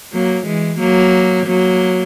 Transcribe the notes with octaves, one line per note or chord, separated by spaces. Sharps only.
F#3 A#3
E3 G#3
F#3 A#3
F#3 A#3